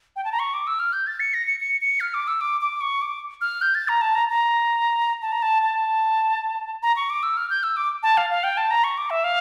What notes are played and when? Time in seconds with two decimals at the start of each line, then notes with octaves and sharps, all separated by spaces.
0.16 G5
0.25 A5
0.32 A#5
0.39 C#6
0.54 D6
0.67 E6
0.79 F6
0.93 G6
1.07 A6
1.20 C#7
1.34 A#6
1.47 C#7
1.60 C#7
1.81 C#7
2.00 F6
2.14 D6
2.28 E6
2.41 D6
2.61 D6
2.81 C#6
3.02 D6
3.41 F6
3.62 G6
3.75 A6
3.88 A#5
4.01 A5
4.15 A#5
4.29 A#5
5.22 A5
5.32 A#5
5.42 A5
5.63 A5
6.83 A#5
6.96 C#6
7.10 D6
7.23 E6
7.37 F6
7.50 G6
7.63 E6
7.77 D6
8.03 A5
8.17 F5
8.30 F5
8.44 G5
8.57 A5
8.71 A#5
8.84 C#6
8.98 D6
9.10 E5
9.24 F5